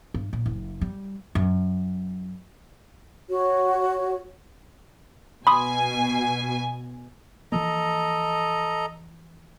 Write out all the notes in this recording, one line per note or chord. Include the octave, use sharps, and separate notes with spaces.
G2
A#2
F#1
G3
F#2
F#4 C#5
B2 G#5 B5 C6 D#6
E3 F3 A#3 A4 D#5 A#5